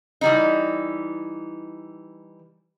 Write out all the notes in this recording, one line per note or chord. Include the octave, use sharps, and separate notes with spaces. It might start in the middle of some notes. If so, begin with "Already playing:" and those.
E3 G3 D#4